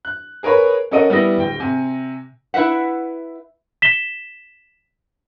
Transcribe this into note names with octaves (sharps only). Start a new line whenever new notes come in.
F#6
G#4 A#4 B4 C#5 B5
C#4 A4 A#4 D#5 F#5 D#7
G3 B3 E4 G4 D#6 A#6
D1 G5
C3 G#5
E4 B4 E5 F#5
B6 E7 G7